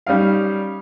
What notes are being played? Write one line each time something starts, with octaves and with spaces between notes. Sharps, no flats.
G3 C#4 D#4 F5